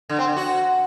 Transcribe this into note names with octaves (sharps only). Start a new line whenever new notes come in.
D3
C4
D3
F#4